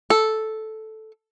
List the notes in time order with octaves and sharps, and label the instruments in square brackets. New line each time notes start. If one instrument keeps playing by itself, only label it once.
[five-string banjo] A4